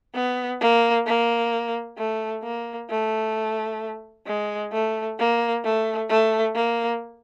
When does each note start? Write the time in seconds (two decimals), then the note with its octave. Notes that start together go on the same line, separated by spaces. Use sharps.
0.15 B3
0.61 A#3
1.07 A#3
1.98 A3
2.43 A#3
2.90 A3
4.27 G#3
4.72 A3
5.19 A#3
5.64 A3
6.09 A3
6.55 A#3